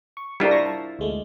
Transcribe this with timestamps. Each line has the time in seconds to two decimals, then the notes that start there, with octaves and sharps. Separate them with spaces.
0.17 C#6
0.40 G3 D4 E4 F4 A#4 C5
0.51 C6 C#6 A#6
0.66 A5
0.99 D2 G#3 A3